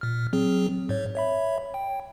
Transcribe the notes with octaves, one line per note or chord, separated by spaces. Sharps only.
A#2 F6
F#3 C4 G#4
G#2 C#5
C#5 E5 B5
G5